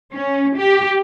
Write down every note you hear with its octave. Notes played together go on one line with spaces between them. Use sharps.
C#4
G4